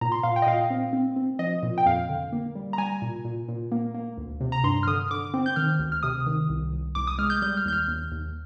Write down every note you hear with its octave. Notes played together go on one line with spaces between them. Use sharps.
A#2 A#5
C6
A#2 F5
G5
D#5
A#2 F5
C4
C4
C4
F3 D#5
A#2
G5
F2 F5
D3
A#3
G3
A#5
G3 G#5
A#2
A#2
A#2
A#3
A#3
D2
C3
A#5
G2 C6
F6
D3 D#6
D3 D6
C4
G6
D#3 F6
D2
F6
C3 D#6
D#3
C2
C2
C2 D6
D#6
G#3 F6
G6
G3 G6
F6
D#2 G6
F6
D#2
D#2